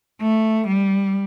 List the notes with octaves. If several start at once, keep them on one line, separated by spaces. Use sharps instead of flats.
A3
G3